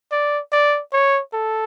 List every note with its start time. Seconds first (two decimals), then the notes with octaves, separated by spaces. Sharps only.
0.12 D5
0.52 D5
0.93 C#5
1.33 A4